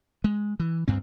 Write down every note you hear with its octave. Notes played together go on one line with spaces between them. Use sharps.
G#3
E3
D2 G2 C4